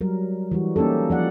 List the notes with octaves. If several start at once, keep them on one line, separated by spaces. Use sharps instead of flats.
F#3 G3 A#4
E3 G3 F#4
A#3 C#4 D#4 G4 A4
F3 D5 F#5